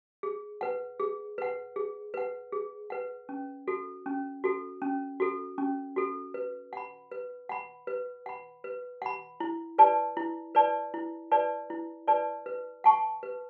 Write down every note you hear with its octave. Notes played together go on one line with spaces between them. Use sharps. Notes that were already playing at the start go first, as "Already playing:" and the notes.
G#4
B4 F#5
G#4
B4 F#5
G#4
B4 F#5
G#4
B4 F#5
C#4
F#4 A4
C#4
F#4 A4
C#4
F#4 A4
C#4
F#4 A4
B4
F#5 B5
B4
F#5 B5
B4
F#5 B5
B4
F#5 B5
E4
B4 D5 A5
E4
B4 D5 A5
E4
B4 D5 A5
E4
B4 D5 A5
B4
F#5 A5 C#6
B4